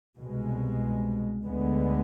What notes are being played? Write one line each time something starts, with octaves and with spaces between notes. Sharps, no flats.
C2 B2 G#3
D2 D3 G#3 B3